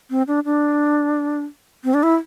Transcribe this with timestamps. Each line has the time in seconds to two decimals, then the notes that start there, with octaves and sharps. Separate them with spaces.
0.10 C4
0.28 D4
0.45 D4
1.84 C4
1.94 D4
2.03 E4